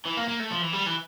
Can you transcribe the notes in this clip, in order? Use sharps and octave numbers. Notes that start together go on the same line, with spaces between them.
E3
A#3
A#3
A3
F3
E3
G3
E3